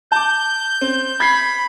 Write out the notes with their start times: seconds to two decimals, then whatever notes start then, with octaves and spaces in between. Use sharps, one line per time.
0.12 A5 D6 G6
0.81 C4
1.20 B5 G#6 C7